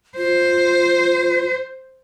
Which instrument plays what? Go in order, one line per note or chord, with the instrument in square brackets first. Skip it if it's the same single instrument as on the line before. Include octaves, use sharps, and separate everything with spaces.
[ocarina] F4 [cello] C5